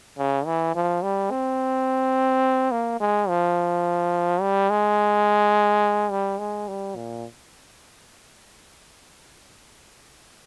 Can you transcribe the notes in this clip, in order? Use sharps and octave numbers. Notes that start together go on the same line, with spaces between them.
C#3
E3
F3
G3
C4
A#3
G#3
F3
G3
G#3
G3
G#3
G3
A#2